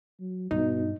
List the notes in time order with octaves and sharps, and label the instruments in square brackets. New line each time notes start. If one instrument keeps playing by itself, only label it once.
[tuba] F#3
[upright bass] G2 [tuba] B2 [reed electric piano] D#4